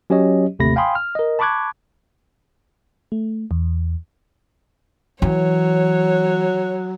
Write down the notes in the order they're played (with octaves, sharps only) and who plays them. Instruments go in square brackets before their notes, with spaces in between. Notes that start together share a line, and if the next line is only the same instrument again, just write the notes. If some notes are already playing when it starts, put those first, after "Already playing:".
[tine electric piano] F#3 C#4 G4 C#5 D#5
G1 D#2 C3 A3 B5 A#6
F5 G5 G#5 B5 C6 D#6
F6
A#4 D#5
A5 B5 C#6 D6 F#6 G#6
[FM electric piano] A3
E2
[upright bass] E3 [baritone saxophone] F#3 [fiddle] C#5